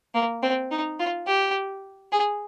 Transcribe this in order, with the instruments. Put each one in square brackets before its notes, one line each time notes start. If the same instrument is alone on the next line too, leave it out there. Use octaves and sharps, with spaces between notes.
[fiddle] A#3
C4
D#4
F4
G4
G#4